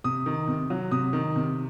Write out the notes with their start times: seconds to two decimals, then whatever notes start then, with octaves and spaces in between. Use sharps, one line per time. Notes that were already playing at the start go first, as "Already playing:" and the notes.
0.04 C3 D#6
0.26 D#3
0.47 C3
0.70 F#3
0.91 C3 D#6
1.13 D#3
1.36 C3